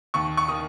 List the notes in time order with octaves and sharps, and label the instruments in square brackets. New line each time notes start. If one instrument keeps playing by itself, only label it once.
[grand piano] D#2 C#6
C#6
D#3 D#6